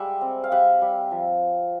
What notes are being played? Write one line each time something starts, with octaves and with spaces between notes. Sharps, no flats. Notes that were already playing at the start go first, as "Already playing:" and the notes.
Already playing: G3 G#3 E5 F#5
C4
F5
G3 E5 F#5
G3
F3